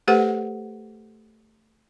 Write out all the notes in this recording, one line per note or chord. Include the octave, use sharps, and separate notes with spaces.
A3 G4 A4 B4 C5 F#5